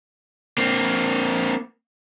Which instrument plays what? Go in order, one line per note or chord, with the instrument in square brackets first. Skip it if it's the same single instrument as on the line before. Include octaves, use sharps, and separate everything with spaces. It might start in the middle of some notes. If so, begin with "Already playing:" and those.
[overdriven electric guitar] A#3 C4